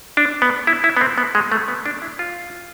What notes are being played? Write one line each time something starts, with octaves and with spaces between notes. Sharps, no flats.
D4
B3
E4
E4
B3
C4
B3
G#3
A3
B3
D4
E4
F4